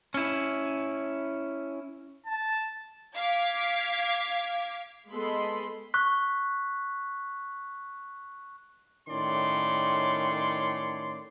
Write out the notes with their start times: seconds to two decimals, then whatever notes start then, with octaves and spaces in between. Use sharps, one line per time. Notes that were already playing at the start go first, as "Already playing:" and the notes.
0.14 C#4 E4
2.26 A5
3.15 F5 D6 G#6 B6
5.12 G#3 B3 A4 D#5 B5 C6
5.94 C#6 F#6 B6
9.08 A2 D#3 C#4 C#5 D5 C6